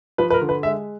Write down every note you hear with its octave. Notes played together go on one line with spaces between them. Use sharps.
F3 B4
B4
A#4
D3
B4
G#3 E5